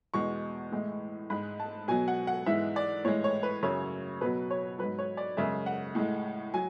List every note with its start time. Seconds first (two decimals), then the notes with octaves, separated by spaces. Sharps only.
0.14 E2 B2 G#3 C#6
0.72 A2 E3 G#3
1.30 G#2 G#3 B5
1.60 A5
1.88 B2 F#3 G#5
2.08 F#5
2.27 F#5
2.46 G#2 E3 G#3 E5
2.76 D5
3.05 A2 E3 G#3 C#5
3.24 C#5
3.43 B4
3.63 F#2 C#3 F#3 C#5
4.21 B2 F#3 B4
4.51 C#5
4.79 G#2 F#3 B4
4.99 C#5
5.17 D5
5.37 F#2 C#3 G#3 E5
5.66 F#5
5.95 A2 G#3
6.54 F#3 G#5